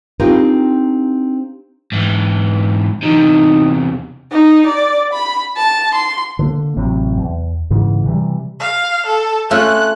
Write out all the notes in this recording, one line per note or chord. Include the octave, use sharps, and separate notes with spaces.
C4 D4 D#4 F4 G4 A#4
G#2 E3
E2 C3 D#4
D#4
D5
B5
A5
C6
D3 A#3
A1 C3 F#3
E2
G#2 C#3 E3
C3 E3 G3
F5
A4
A3 C#4 F4 F#6